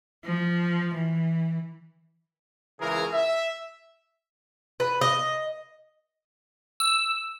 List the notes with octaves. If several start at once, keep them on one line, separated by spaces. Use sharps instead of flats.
F3
E3
C#2 C#3 E3 G#4 A#4
E5
B4
D#5
E6